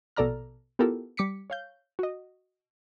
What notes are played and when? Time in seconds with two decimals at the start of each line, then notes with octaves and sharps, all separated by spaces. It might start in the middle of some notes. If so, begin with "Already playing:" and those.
0.16 A#1 B2 A4 D5 A#5 F6
0.79 B3 E4 F4 G4 A4 A#4
1.17 G3 D6 B6 C#7
1.50 C#5 F5 G6
1.99 F#4 D#5